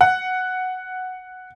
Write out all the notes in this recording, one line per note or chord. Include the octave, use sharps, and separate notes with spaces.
F#5